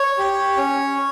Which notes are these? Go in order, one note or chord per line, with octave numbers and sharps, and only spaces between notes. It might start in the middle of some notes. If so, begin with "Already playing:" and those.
Already playing: C#5
G4
C#4